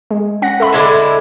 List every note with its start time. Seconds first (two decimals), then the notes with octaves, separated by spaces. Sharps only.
0.11 G#3
0.42 C#4 F#5 A#6
0.60 A4 E5 B5
0.72 D3 G#3 E4